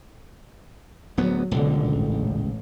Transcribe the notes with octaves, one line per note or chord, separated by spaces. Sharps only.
D1 D2 F#3 B3
D#1 C#2 B2 D3
A1